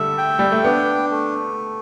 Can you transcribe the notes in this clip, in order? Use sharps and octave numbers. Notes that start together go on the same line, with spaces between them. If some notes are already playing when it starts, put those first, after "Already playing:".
Already playing: D3 G3 A3 E5
G5
G3
A3
B3 D4
A3